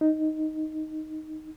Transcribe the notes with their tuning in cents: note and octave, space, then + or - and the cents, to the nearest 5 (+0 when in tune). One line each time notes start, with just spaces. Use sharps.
D#4 +0